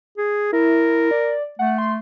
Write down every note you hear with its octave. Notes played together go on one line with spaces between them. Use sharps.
G#4
E4 A#4
D5
A3 F#5
C6